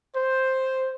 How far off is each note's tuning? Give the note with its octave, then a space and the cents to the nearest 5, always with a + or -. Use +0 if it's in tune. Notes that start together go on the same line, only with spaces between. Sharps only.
C5 +5